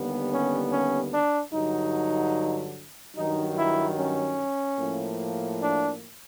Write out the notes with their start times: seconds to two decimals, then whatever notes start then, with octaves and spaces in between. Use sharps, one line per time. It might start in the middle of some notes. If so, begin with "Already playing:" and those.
Already playing: D#2 D3 G3 B3
0.31 C#4
0.71 C#4
1.12 D4
1.53 G2 D3 F#3 D#4
3.16 G2 D#3 F#3 D#4
3.57 E4
3.98 C#4
4.79 A2 F3 A#3
5.61 D4